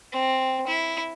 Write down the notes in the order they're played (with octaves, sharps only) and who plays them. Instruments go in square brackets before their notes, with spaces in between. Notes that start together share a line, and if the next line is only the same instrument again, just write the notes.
[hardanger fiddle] C4
E4